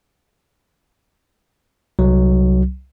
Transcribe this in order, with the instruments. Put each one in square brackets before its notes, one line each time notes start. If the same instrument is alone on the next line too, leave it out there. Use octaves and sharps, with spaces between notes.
[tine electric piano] C2 F#3